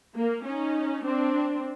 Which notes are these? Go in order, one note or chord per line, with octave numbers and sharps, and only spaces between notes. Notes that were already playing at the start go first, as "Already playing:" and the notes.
A#3
C#4 D#4
C4 D4